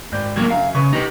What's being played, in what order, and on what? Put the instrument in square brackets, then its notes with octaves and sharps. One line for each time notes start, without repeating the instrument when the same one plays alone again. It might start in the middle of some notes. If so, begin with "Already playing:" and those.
[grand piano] G#1 D5 G6
[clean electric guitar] A2 F#3 A#3 [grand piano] G#6
[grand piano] F#2 C#3 [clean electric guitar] F5
[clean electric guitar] C#3 [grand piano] B4 C#6
[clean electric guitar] D#4 B4 [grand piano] G4